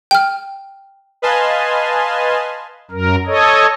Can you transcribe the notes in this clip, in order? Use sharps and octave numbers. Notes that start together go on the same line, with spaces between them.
G5 F6
B4 D#5 F5 G#5 A5 C6
F#2 A#4
A4 C#5 D#5